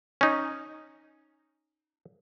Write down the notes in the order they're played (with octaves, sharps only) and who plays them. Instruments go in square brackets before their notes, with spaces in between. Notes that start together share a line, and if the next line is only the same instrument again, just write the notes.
[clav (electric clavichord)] C#4 D#4